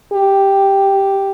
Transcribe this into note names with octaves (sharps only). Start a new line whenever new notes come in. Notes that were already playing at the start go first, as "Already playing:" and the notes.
G4